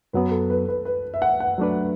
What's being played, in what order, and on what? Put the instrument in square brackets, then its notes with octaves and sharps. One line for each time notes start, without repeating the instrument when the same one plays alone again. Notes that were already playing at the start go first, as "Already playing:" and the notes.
[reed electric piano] F#2 F#3 B3 [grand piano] B4
[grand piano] A4
B4
B4
B4
E5
F#5
F#5
[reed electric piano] F#3 A3 D4 B4